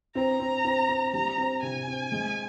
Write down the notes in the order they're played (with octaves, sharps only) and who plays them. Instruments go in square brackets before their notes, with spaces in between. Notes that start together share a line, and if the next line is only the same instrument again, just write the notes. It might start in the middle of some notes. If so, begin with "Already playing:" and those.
[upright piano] C4 [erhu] A#5
[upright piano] C4
C4
C4
[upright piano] G3 [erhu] A#5
[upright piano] C4
[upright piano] C3 [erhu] G#5
[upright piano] C4
G#3